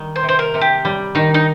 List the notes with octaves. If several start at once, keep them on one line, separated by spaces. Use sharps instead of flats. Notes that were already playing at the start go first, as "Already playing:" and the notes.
Already playing: D#3 G3
C5
C3
C5
A#4
C3
G4
G3
D#3 D#4
D#4